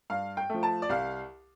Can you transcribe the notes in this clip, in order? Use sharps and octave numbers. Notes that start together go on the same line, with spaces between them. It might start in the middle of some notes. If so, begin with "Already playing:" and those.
G2 F5
G5
F3 A3
A5
D5
C2 F5